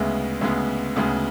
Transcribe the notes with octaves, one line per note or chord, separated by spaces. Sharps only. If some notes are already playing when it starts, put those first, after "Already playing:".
Already playing: D2 C#3 G#3 B3 E5
D2 C#3 G#3 B3
D2 C#3 G#3 B3